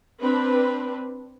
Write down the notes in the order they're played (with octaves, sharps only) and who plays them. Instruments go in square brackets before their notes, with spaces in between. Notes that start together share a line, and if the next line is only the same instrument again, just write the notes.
[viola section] C4 D4 B4